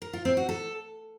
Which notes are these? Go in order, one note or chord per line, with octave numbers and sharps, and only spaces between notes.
A#4
F4
C4
F#4
A4